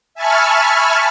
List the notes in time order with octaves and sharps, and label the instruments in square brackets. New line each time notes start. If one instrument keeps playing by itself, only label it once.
[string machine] E5 G#5 A5 B5 C#6 F6